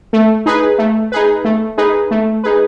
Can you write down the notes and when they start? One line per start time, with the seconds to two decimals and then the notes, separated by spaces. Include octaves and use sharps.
0.13 A3
0.46 D#4 G#4 B4
0.78 A3
1.12 D#4 G#4 B4
1.45 A3
1.78 D#4 G#4 B4
2.11 A3
2.44 D#4 G#4 B4